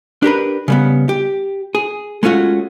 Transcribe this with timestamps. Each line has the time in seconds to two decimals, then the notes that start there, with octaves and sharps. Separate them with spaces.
0.23 D4 G4 A#4 B4
0.68 C#3 G3 B3
1.09 G4
1.75 G#4
2.23 G#3 A3 C#4 F4 F#4